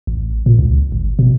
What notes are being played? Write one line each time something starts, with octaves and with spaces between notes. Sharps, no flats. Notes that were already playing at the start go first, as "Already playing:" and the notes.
A1
A#2
C#2
G#1
B2